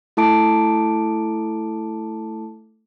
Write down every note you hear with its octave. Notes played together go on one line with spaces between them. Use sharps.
A3 E4 A4 A5 D6 D7